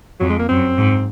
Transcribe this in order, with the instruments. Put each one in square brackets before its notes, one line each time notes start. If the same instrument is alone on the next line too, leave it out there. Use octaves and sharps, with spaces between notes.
[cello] F2 [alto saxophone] F#3
[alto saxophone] G#3
A#3
[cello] F#2 [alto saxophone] C4
[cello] G#2